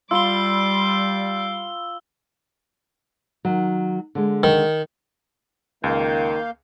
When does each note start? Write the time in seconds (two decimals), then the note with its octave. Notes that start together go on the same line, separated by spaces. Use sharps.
0.11 G3 F4 B5 C6 D6 E6 G7
3.45 D#3 F#3
4.15 D3 G#3
4.43 D#3
5.84 C#2 D#3 A#3 F5 G6